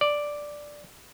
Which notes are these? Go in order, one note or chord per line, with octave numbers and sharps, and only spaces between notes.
D5